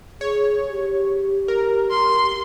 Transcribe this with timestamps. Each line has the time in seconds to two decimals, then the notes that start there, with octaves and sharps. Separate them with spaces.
0.21 G#4 C#5
0.71 G4
1.48 A#4
1.90 C6